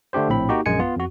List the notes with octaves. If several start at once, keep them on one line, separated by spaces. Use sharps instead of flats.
D3 A3 D4 G4 C5
A#1 A2 C4 B5
A#3 D#4 F#4 G4
A#1 F#2 G#3 G#5 C#7
B3 F4
F2 F#4